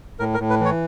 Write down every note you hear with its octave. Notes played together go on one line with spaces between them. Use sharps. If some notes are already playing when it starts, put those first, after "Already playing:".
A2 A#4
A#4
A2
B4
E3 C#5